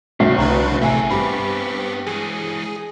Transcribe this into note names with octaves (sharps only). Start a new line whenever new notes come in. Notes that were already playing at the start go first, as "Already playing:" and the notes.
F1 D2 C#3 F#3 E5 G5
C2 D4 E4 B4 A#5
A1 C3 A3 A#3 G#4 E5 G#5 A#5
G2 B3 C4 G4 B5
E3 G#3 G#4